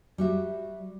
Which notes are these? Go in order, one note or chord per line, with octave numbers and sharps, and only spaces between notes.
G3 F#4 E5